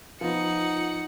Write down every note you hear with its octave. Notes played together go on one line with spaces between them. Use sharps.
F3 B3 D#4 F4 F#5